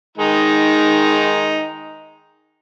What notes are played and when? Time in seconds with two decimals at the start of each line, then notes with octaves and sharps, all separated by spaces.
0.18 D#3 G#3 D#4